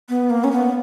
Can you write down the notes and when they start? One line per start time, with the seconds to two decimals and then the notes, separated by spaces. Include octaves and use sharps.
0.09 B3
0.30 A#3
0.44 C#4
0.51 B3